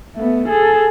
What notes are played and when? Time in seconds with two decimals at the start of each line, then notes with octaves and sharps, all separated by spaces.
0.16 A3 B3
0.48 G#4 A4